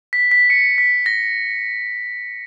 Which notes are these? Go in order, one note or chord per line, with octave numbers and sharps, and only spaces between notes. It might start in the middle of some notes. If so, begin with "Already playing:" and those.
B6
B6
C#7
B6
A#6